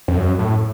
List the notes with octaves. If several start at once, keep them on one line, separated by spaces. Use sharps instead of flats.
F2
F#2
A2